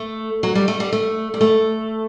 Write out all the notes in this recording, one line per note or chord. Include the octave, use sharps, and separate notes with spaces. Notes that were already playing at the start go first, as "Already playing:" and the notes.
Already playing: A3
F#3
G3
A3
G3
A3
G3
A3